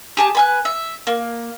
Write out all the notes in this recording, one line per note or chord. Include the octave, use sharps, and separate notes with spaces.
G4 G#4 A5
B4 G#5 F#6
E5
A#3